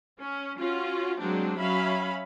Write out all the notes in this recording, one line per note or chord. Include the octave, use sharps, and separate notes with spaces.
C#4
C#4 F4 F#4
F#3 G#3 A#3 C4 D4
F#3 C#4 E5 F5 B5